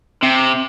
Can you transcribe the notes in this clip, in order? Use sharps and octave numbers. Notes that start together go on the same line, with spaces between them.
C3